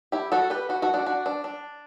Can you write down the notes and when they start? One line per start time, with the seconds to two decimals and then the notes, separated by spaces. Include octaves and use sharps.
0.12 E4 G4
0.32 F#4 A4
0.50 G4 B4
0.69 F#4 A4
0.82 F#4 A4
0.94 D4 F#4
1.06 D4 F#4
1.26 D4
1.44 D4